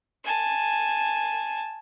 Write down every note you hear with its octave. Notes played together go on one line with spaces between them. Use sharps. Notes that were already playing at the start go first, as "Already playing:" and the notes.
G#5 A5